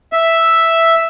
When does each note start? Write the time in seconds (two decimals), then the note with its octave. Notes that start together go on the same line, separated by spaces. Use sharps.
0.13 E5